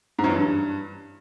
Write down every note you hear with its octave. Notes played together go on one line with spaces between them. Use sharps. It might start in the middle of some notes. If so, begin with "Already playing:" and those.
G#2
F#2
E3
G2